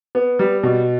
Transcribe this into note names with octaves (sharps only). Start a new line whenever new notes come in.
B3
G3
B2